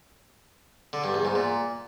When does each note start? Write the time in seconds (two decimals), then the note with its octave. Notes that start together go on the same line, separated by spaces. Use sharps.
0.93 D3
1.04 G2
1.14 E2
1.25 G#2
1.35 A#2